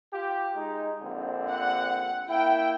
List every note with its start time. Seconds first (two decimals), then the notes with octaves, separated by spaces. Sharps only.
0.12 F4 G4
0.56 G#3 D#4
1.02 A#1 D3 C4
1.50 F#5
2.29 A#3 E4 G5